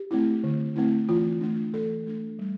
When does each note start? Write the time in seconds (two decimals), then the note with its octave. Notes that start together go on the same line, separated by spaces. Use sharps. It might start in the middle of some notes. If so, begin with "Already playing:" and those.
Already playing: G4
0.11 A3 C4 E4
0.44 D3
0.76 A3 C4 E4
1.09 E3 F4
1.41 A3 D4
1.73 E3 A4
2.06 A3 D4
2.39 G3